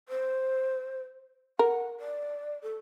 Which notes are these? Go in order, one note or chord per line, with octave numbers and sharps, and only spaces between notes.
C5
A#4 F#5
D5
A4